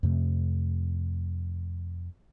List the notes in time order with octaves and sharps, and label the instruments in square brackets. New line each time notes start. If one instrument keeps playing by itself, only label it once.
[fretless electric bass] F2 C3 A3